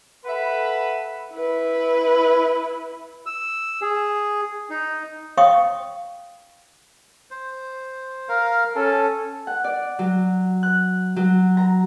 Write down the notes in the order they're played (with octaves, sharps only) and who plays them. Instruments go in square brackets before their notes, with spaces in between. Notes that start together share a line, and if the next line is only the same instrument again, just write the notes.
[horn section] A4 B4 E5 F#5 B5
[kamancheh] E4 B4
[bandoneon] E6
G#4
D#4
[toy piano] C#5 F5 G5 C#6 D#6
[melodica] C5
A#4 F5
[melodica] C#4 [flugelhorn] A4
[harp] F#5
D5
F#3
F#6
F#3
A#5